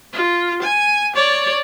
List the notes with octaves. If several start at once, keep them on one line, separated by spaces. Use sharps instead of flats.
F4
G#5
C#5 D5